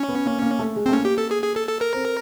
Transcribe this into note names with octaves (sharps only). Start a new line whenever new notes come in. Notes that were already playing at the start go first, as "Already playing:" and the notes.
Already playing: C#4
B3
A#3
A#3
A3
G#3
A3 C4
A#3 C#4
G4
A4
G#4
G#4
A4
A4
A#4
C4